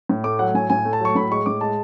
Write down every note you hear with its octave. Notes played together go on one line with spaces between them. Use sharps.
A2
A3 D6
F#3 F#5
A2 G#5
A2 G#5
A3
A5
F#3 C#6
A2 B5
G#3 C#6
A2 D6
G#3 A5